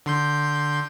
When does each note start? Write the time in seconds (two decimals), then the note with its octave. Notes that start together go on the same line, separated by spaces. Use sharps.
0.06 D3 C6 G6